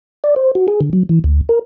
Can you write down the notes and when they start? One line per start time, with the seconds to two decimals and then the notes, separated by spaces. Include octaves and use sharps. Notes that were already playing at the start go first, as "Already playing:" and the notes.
0.24 D5
0.36 C5
0.55 F#4
0.68 G#4
0.81 D3
0.93 F#3
1.09 E3
1.24 D2
1.49 A#4